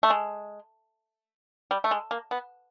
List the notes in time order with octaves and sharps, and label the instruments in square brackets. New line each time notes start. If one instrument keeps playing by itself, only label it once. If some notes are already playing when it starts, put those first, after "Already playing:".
[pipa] A3
G#3
G3
A3
G#3
A#3
B3